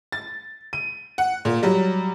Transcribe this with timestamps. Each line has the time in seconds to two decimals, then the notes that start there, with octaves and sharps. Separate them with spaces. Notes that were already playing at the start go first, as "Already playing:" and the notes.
0.12 A6
0.73 D#7
1.18 F#5
1.45 A#2
1.63 F#3 G3